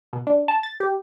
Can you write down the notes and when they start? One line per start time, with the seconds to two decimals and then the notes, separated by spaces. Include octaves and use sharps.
0.13 B2
0.27 D4
0.48 A5
0.63 A6
0.80 G4